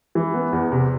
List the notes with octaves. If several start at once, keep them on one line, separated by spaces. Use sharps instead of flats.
E3
B3
E2
C3